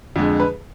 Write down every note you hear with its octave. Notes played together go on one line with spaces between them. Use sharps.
F2 D3 G#3
B4